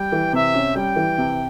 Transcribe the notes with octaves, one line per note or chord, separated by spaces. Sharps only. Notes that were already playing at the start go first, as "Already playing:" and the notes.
Already playing: G3 G5
E3
C3 E5
C#4
G3 G5
E3
C3